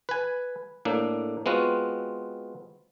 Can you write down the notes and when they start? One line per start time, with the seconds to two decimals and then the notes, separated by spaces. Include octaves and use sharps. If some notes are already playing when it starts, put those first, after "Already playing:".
0.09 B4 G#5
0.85 A2 A#3 D4
1.46 G#3 B3 C4 F4 F#4